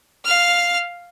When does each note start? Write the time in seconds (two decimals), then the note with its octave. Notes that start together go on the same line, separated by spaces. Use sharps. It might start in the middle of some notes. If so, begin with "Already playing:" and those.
0.25 F5 F6